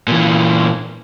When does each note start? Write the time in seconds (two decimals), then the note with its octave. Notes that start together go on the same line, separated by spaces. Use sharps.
0.08 A#2 E3